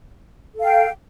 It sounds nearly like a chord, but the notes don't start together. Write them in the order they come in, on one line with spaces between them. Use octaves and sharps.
A4 F5 G5